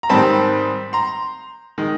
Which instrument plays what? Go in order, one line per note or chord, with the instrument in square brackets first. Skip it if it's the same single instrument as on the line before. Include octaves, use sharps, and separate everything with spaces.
[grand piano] A#5
G#2 D#3 G3 C4 A5 B5
A#5 C6
D#3 G#3